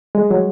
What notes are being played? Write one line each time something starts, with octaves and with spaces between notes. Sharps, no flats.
G#3
F#3